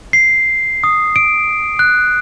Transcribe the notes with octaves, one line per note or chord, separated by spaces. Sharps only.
C7
D#6
D7
F#6